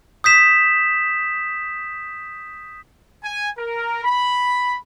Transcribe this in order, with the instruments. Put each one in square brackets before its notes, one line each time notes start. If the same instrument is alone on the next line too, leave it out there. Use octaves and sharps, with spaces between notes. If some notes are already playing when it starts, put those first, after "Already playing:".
[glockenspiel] D#6 G6 B6 E7
[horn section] G#5
A#4
B5